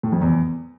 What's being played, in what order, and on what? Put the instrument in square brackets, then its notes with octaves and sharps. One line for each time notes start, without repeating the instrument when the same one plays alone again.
[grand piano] A2
F2
E2